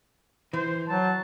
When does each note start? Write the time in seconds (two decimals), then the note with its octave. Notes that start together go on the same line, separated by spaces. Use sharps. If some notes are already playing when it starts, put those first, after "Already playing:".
0.53 E3 C5
0.88 F#3 A5